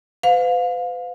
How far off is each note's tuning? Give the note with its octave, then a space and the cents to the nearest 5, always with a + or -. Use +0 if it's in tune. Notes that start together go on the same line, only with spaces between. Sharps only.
B4 +45 F5 +25